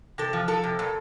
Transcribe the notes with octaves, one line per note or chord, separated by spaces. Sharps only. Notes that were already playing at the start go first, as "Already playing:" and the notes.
C3 A4
F3
F3 A4
C3
A#2